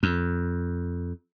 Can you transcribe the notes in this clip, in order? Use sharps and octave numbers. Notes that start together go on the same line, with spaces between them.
F2